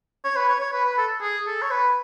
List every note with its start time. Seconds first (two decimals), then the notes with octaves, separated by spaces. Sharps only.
0.24 C#5
0.36 B4
0.49 C#5
0.60 C#5
0.73 B4
0.85 B4
0.98 A4
1.21 G#4
1.47 A4
1.62 C#5
1.71 B4